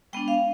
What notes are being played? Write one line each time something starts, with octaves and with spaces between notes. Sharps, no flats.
G#3 B3 D4 G5
F5